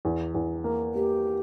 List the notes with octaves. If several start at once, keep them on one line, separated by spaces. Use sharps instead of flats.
E2
E2
A#3
A#3 G4